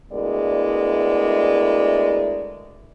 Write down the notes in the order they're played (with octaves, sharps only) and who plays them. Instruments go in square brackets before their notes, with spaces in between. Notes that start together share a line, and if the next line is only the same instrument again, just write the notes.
[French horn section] D2 G#3 B3 E4 A#4 D5